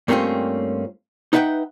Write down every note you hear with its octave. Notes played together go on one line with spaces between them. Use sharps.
G2 A3 A#3 C4 C#4 F4
D#4 B4 E5 F#5 G5